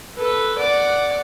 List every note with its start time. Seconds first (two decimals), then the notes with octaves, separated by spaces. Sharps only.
0.18 A4 B4
0.59 D5 F#5